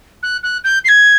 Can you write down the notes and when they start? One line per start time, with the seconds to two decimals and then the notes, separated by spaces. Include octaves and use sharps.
0.23 F#6
0.43 F#6
0.64 G6
0.84 C7
0.88 G#6